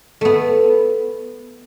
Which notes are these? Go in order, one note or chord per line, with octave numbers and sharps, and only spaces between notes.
A3 B3